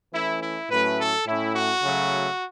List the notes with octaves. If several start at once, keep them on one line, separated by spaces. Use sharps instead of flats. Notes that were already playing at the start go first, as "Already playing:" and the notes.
E3 A3 C#4 E4
E4
A2 F#3 A3 C#4 B4
A4
A2 A3 C#4 E4
F#4
C#3 F#3 A3